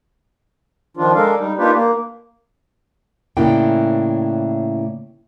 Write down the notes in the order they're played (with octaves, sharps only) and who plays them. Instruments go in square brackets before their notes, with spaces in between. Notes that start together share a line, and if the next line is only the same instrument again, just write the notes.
[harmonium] D#3 F3 D4 F4
G#3 D4 A4 A#4 F5
G3 D#4
A#3 D4 D#4 F4 G4 B4
A#3
[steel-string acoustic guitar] A2 C#3 A#3 D4 E4 G5